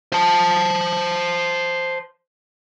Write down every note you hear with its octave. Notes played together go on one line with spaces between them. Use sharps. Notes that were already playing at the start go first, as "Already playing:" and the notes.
C5 A5